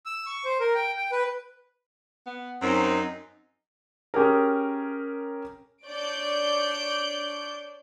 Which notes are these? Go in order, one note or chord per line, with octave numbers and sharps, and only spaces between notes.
E6
C#6
C5
A#4
G5
G5
B4
B3
F#2 C4 D#4
C#4 G4 G#4 A#4
D4 C#5 D5 G6 D7